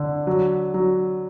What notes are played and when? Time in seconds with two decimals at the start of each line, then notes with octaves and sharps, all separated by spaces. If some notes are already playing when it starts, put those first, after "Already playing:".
Already playing: D3
0.27 F#3
0.74 F#3